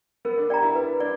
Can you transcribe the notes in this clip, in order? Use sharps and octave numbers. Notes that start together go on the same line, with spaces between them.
B3 A#4
D4
G4 D5 G5 A#5
E4
E4 B4
D4 D5